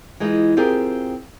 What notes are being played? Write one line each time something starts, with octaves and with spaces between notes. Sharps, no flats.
E3 G#3 D#4 F4
C4 F4 G4 G#4 A#4